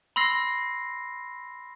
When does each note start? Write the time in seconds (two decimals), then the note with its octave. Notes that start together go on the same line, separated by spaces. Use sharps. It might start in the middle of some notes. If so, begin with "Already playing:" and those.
0.16 B5 C6 E6 A#6 C7